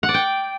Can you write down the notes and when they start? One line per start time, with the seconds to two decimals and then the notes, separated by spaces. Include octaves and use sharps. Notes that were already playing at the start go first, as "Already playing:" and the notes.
0.03 F#5
0.09 D5
0.14 G5